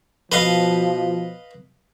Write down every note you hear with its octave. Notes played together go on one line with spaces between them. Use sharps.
B2 F3 B4 D#5 F5